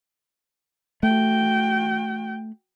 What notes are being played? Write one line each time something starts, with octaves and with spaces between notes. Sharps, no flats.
A3 F#4 G5